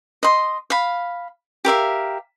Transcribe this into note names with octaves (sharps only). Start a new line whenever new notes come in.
D#5 C6
F5 B5
G4 A#4 E5 F5